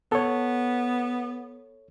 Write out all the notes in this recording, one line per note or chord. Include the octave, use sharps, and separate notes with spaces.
B3 A4 C#5